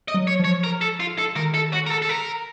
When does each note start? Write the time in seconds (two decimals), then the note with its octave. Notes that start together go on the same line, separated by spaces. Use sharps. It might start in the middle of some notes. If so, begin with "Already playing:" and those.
0.08 D#5
0.14 F#3
0.27 C#5
0.40 F3 C#5
0.64 A#4
0.81 A4
1.00 F4
1.18 A4
1.36 D#3 A#4
1.54 A4
1.73 F#4
1.86 A#4
1.91 A4
2.02 A4
2.09 A#4